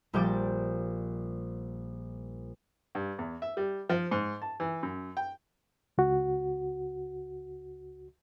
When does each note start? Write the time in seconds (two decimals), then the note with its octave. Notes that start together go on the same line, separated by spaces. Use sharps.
0.14 A#1 G3 A#3 G5 D6 A6
2.95 G2
3.18 E2
3.42 E5
3.57 G3
3.89 F3
4.11 G#2
4.42 A5
4.60 E3
4.83 F#2
5.17 G5
5.98 C#2 F#4